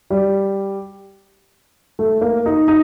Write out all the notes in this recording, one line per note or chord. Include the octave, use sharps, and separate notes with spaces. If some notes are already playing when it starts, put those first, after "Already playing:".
G3
A3
A#3
D#4
D#4